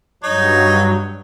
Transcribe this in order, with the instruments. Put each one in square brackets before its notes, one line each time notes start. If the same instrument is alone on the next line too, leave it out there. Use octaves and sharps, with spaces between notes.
[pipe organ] G2 F#3 [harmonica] D#4 C#5